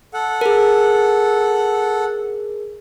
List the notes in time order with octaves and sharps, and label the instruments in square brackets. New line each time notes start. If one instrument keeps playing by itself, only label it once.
[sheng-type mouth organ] A4 F#5
[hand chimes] G#4 A#4